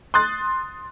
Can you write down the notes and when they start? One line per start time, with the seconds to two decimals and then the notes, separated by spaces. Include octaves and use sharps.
0.14 C6 D#6 F#6 A6